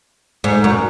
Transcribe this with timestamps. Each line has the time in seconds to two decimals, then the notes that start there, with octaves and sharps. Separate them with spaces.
0.44 G#2
0.64 F#2